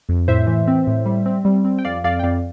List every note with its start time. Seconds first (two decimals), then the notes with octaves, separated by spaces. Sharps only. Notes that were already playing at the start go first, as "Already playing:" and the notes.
0.09 F2
0.28 A2 C5 E5
0.47 E3
0.68 C4
0.87 A2
1.06 G3
1.26 C4
1.45 G3
1.65 C4
1.79 G5
1.85 F2 D5 F5
2.04 F2 D5 F5
2.19 G5
2.23 F2 D5 F5